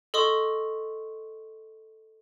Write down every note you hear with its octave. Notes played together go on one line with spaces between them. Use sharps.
A4 D#5 C6 C#6 D#6